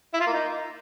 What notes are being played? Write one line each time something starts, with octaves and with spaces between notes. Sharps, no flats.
E4
F4
A#3
D#4